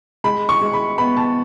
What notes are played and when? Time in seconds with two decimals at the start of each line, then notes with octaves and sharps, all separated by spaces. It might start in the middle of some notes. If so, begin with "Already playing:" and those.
0.24 G#3 B5
0.49 C#6
0.61 G#3
0.73 B5
0.98 B3 B5
1.17 A5